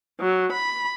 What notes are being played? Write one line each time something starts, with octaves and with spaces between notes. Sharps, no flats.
F#3
B5